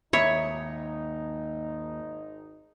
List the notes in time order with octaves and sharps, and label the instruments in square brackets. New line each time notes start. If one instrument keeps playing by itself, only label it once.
[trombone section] G#1 D#4 [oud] D#2 [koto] E4 [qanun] C#5